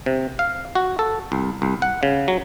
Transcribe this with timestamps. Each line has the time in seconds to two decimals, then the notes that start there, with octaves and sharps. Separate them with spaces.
0.06 C3
0.39 F5
0.75 F#4
0.99 A4
1.32 C2
1.62 C2
1.82 F#5
2.03 C#3
2.28 F#3